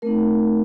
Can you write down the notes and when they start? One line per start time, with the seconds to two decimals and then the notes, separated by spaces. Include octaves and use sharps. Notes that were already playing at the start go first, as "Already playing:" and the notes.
0.02 A3 C4 D#4 A#4